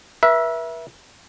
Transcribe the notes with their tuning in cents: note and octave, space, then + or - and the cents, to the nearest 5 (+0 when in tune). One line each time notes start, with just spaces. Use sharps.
B4 -45 E5 +0